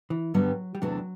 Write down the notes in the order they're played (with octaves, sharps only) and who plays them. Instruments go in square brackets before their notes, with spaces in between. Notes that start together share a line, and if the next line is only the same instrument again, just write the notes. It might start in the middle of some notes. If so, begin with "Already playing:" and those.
[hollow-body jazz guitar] E3
[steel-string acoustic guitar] G2 D3 G3 B3 [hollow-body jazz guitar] F#3
[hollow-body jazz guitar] G3
[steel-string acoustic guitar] E2 C3 E3 A3 D4 [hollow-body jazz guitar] F#3